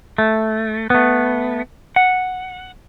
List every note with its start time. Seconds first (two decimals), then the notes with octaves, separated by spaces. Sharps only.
0.18 A3
0.90 A3 B3
1.96 F#5